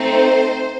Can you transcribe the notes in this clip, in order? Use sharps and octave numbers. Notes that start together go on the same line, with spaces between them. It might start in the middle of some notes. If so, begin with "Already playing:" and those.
Already playing: A3 C4 D#4 A4 C5